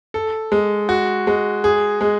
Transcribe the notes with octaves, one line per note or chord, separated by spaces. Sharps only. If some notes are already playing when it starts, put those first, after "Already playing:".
A4
G#3
F#4
G#3
G#4
G#3